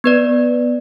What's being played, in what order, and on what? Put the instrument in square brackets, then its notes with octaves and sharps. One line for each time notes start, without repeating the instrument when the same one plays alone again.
[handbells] B3 B4 D5